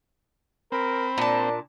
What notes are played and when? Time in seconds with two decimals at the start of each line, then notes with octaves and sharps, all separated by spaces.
0.72 C4 A#4 B5
1.18 A#2 D4 A5